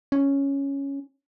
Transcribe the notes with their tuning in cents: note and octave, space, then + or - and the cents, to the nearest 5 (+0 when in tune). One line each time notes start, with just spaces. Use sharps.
C#4 +0